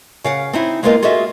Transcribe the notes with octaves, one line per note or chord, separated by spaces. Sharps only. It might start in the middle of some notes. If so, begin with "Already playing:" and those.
C#3 F5 F#5
C4 D#4 E4
G#3 A#3 B3 F4 A#4 D#5
F4 F#4 G#4 A4 D#5 E5